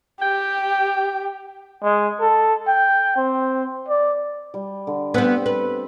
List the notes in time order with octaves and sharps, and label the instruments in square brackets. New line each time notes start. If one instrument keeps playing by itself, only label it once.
[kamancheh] G4 [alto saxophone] G5
[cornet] G#3
A4
G5
C4
D5
[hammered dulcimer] G3
D3
[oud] G3 B3 [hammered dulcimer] C4
[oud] B4